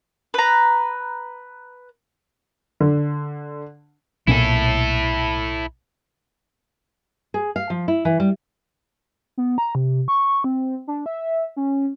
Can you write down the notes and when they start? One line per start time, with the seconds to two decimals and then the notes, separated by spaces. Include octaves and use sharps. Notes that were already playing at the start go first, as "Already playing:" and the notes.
0.34 B4 A#5
2.80 D3
4.28 B1 A#2 C#4 E4 A4
7.34 G#4
7.56 F5
7.70 F3
7.88 E4
8.05 E3
8.20 G3
9.37 B3
9.58 A#5
9.75 C3
10.08 C#6
10.44 C4
10.87 D4
11.06 E5
11.57 C#4